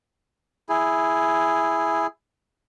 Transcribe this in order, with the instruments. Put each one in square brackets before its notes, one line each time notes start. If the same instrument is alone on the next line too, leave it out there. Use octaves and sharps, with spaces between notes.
[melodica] E4 G#4